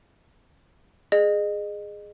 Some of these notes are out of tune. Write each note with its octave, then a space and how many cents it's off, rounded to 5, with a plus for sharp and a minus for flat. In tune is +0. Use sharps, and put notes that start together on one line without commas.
G#4 +0 D#5 -30